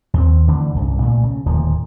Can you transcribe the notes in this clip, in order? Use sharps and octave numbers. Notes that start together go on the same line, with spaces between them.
D#2 C4
D3 E3 A3 D4
C2 G2 C#3
A#2 A3
C#3
D1 D#2 A#2 F3